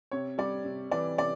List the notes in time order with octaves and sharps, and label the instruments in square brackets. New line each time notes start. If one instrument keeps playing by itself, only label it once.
[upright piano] C3 C#5
G3 D5
C3
E3 D5
C3 D5